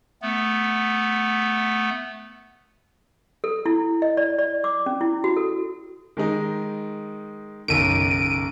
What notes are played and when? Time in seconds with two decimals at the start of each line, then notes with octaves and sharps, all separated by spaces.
0.22 A3 B3
3.44 A4
3.66 E4
4.02 D#5
4.17 D5
4.39 D5
4.64 D6
4.86 C#4
5.01 E4
5.24 F#4
5.37 A4
6.17 D#3 G#3 D#4
7.68 F#1 B1 D#3 D7 D#7